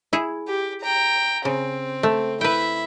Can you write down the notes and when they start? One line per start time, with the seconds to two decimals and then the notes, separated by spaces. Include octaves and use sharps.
0.13 E4 G#4
0.48 G4
0.83 G5 A#5
1.45 C#3 C4
2.03 A3
2.41 E4 B4 E5 G5